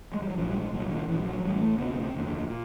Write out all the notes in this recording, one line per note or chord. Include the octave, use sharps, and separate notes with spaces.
G#3
G3
F#3
A#1 G#2 F3
G3
G#3
C2 A#2 F#3
D#3
A#1 A#2 E3
G3
F#3
F#3
A1 A2 G3
A3
D2 C3 B3
B3
C4
F1 D#2 D3
A#2